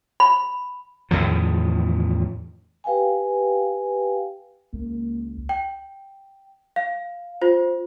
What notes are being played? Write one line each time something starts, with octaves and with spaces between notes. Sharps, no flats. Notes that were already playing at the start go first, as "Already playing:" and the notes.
B5
E2 A2 D#3 F3
G4 B4 F5 G5 G#5
C#2 A#3
G5
F5
F4 C5